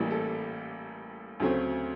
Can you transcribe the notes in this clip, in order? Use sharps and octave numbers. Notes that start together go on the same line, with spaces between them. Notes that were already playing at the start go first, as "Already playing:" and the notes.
Already playing: A1 A2 E3 G3 A#3
A4
D2 C#3 F#3 A3 C4